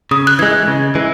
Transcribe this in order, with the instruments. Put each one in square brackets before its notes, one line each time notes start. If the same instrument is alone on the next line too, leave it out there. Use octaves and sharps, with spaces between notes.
[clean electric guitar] C#3 [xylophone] D#6
[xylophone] F#6
[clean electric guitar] E3 G#3 [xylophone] G#6
[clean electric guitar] C#3
E3 G#3